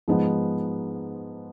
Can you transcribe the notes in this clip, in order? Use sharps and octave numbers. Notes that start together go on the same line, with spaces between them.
G#2 F3 G#3 B3 D#4